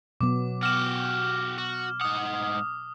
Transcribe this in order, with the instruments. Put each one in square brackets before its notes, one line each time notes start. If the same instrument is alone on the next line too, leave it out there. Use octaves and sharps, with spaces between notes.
[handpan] B2 F#3 B3 [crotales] D6
[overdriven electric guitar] F#4 G4 [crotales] F6 E7
[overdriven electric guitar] F#4
[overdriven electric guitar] G#2 F#5 [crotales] D#6